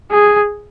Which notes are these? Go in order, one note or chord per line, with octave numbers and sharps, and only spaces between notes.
G#4